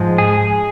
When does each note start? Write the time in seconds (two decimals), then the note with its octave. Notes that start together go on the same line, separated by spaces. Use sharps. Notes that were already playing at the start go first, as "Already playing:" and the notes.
Already playing: G#2 F3 G#3
0.18 G#4